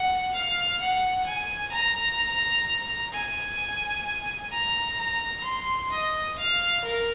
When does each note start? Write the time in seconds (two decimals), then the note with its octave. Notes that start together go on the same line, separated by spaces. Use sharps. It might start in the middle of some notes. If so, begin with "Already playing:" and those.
Already playing: F#5
0.34 F5
0.80 F#5
1.26 G#5
1.72 A#5
3.12 G#5
4.51 A#5
4.98 A#5
5.44 C6
5.91 D#5
6.38 F5
6.84 A#4